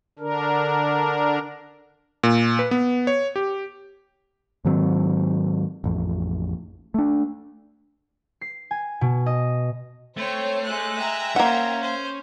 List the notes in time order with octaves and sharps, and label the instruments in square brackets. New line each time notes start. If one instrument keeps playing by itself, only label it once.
[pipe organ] D3 D4 A#4
[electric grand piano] A#2
B4
B3
C#5
G4
[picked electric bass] G#2 D#3 F#3 C4
A1 F2
A3 D4
[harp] C7
G#5
B2
D#5
[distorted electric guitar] A3 [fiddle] C4 [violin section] C5 C#5
[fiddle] G#3 F#6
[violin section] E5 G5 A#5
[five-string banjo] A#3 F#5 [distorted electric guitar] C#4 [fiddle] A#4 C5
[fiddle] C5